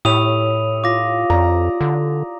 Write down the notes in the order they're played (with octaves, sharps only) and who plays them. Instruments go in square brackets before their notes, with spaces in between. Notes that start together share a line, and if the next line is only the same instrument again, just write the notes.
[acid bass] A2 [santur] E4 G4 C#5 [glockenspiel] D#6 D#7 F7
[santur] F4 [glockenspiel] D6 A#6
[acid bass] F2 [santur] D5 A#5
[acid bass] D3